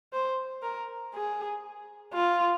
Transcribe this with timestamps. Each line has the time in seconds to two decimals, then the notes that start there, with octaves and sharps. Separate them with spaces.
0.13 C5
0.62 A#4
1.14 G#4
2.14 F4